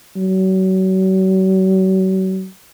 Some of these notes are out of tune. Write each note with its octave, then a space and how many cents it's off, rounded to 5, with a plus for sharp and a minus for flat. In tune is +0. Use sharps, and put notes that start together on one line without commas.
F#3 +35